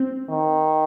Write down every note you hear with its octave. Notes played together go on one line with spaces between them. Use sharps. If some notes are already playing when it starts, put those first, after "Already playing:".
Already playing: C4
D#3